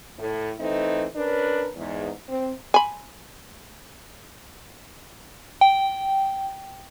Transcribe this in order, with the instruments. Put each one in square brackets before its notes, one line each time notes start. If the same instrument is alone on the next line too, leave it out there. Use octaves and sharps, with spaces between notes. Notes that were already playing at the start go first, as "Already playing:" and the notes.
[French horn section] A2
E3 A3 C4 D#4
C#4 D4 A#4 B4
E2 G#2
C4
[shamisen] G#5 B5
[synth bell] G5